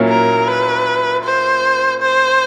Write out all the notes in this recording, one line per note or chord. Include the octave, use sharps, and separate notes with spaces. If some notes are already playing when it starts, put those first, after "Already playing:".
Already playing: A#2 F#3 A#3 C#4 E4
A#4
B4
C5
C5